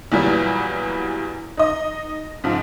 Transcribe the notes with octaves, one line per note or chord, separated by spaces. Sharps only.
E2 A#2 E3 F#3 G3
D#4 D#5
G#2 F3